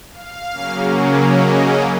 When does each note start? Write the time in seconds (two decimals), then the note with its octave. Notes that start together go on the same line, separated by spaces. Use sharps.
0.11 F5
0.53 C#3 F#3 A#3 C#4
1.34 D#5